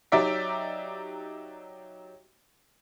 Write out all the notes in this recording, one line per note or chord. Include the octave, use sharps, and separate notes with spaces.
F#3 D#4 G4 D5 E5 B6